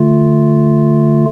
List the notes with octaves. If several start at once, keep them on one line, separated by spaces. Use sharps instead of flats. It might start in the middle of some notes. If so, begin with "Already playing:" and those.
Already playing: D3 A3 F4